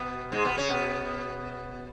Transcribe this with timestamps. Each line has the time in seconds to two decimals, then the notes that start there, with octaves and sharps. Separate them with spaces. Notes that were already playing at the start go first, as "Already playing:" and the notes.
Already playing: B2 B3
0.32 G#2 G#3
0.45 B2 B3
0.57 C#3 C#4
0.69 B2 B3